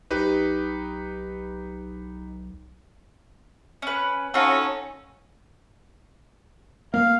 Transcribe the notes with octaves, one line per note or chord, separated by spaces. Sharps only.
B1 D#4 G4 B4
C#4 B4
C#4 D#4 F4 F#4 A4
A#3 F5